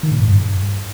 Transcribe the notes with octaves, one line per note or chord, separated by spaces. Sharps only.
D#3
A#2
G#2
G2